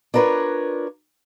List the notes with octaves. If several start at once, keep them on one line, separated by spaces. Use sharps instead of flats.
D4 F4 A#4 B4 C#5